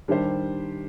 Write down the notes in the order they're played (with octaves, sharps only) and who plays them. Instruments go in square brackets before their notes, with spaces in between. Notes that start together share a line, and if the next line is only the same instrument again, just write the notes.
[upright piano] D#3 G3 D4 G4 C5